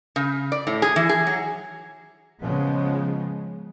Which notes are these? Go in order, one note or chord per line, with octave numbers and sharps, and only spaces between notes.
C#3
D5
A2
G#4
E3
G#4
F#3
C#3 F3 G#3 B3